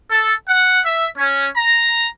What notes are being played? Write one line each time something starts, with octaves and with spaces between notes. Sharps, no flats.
A4
F#5
E5
C#4
A#5